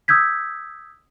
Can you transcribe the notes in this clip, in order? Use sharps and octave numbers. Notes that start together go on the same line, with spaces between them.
D#6 E6 G6 G#6 B6